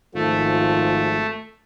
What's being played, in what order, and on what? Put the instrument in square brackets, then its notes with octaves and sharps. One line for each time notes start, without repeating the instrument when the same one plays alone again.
[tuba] G#1 [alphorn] F3 [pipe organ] A3